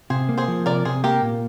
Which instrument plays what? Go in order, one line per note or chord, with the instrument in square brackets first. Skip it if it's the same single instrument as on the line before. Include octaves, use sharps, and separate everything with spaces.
[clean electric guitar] C3 [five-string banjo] G#4 C5
[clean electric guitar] A#3
[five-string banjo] G#4 C5
[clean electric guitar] F3
[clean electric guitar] C3 [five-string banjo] A#4 D5
[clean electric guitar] C3 [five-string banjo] G#4 C5
[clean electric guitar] A#3 [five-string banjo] G4 A#4
[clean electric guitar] A#2